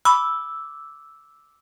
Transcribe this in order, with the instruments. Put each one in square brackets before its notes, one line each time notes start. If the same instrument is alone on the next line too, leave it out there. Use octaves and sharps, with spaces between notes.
[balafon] B5 [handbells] D6 E6